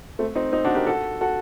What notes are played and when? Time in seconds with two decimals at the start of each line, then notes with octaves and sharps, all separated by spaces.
0.19 A3 C4
0.35 C4 D#4
0.52 C4 D#4
0.65 D4 F#4
0.75 G4 A#4
0.87 F#4 A4
1.21 F#4 A4